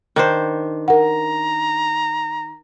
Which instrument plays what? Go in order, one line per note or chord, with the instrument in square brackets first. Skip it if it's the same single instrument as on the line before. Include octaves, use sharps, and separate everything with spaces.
[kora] D#3 D4 C5
[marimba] A#4 F#5 [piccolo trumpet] A#5